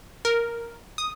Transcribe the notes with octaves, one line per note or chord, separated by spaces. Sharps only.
A#4
D#6